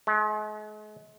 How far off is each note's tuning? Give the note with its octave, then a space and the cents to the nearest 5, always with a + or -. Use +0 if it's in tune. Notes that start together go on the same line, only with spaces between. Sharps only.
G#3 +40